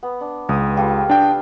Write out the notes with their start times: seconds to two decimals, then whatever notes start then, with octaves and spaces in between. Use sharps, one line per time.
0.03 B3
0.21 D4
0.49 C#2 D#6
0.76 G3 F4 A4
1.09 D4 G5